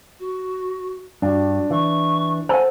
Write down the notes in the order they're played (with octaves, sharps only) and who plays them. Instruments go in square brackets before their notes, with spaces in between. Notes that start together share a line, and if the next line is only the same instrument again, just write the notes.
[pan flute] F#4
[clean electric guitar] G2 [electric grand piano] D4 [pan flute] F#4
[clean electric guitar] E3 [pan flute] C#6
[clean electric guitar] A4 [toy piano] C5 F#5 [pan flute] G#5